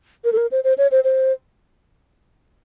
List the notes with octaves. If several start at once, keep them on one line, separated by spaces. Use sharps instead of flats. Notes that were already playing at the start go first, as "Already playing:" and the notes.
A#4
A4
A#4
C5
C5
C#5
C5
C5